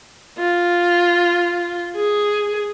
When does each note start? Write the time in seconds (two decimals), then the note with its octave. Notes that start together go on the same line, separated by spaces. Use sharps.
0.39 F4
1.96 G#4